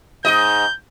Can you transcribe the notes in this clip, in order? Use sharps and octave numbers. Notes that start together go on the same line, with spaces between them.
G#2 G4 D#5 G6